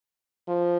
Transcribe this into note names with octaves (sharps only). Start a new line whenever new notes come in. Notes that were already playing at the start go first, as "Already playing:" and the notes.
F3